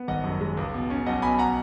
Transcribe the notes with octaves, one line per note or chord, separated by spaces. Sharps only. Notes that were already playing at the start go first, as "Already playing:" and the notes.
Already playing: B3
G#1 D#5 F#5
F#2
G#3
C#2
B2
C#4
B1 D#5 F#5
B2 G#5 B5
F#5 A#5